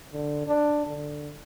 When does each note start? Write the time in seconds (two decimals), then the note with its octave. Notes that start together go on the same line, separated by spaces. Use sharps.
0.12 D3
0.47 D4
0.87 D3